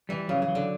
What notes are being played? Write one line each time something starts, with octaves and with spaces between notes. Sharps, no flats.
E3 G3
C#3 F#3
C#3
F#3
D3